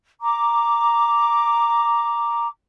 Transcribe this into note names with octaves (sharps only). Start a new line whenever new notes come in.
A#5 D6